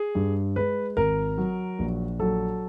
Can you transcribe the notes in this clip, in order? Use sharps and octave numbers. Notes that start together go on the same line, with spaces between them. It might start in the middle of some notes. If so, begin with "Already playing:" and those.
Already playing: G#4
G2
G#3 B4
G#1 A#4
F#3
A#1
F#3 A4